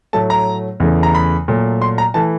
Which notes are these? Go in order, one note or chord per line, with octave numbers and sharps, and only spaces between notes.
A2 F#3 A3 A5
A#5
E2 C#3 E3 A3
A#5
B5
A#2 F#3 A3
C6
A#5
E3 A3 A5